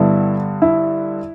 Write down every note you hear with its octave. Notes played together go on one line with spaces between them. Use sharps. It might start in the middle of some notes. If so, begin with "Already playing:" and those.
Already playing: G2 D3 B3 E4 A4
E4